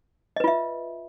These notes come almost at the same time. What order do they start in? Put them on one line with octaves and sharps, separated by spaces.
D#5 B4 F4 E5